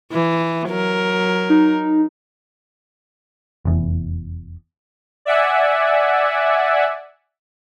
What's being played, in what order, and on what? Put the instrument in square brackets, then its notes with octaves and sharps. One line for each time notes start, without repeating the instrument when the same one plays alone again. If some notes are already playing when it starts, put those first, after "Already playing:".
[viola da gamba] E3
F#3 A#4
[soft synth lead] D#4
[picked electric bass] F1 E2
[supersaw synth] D5 E5 F#5 G#5